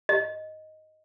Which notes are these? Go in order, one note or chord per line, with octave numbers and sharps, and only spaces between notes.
D#5